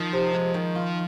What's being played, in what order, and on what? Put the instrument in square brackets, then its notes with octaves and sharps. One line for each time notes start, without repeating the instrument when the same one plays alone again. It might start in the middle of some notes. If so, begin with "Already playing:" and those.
Already playing: [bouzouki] D#3 [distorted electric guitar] F3
[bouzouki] C3
G#3
D#3
F4